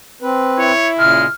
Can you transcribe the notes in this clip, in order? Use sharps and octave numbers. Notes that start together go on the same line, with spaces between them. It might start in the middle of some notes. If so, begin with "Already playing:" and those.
C4 B4
E4 C#5
A#2 C#3 G#3 F6